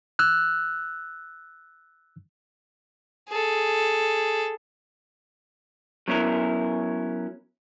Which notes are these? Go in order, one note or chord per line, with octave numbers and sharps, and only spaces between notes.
E6 F#6
G#4 A4
F#3 B3 C#4 E4 A#4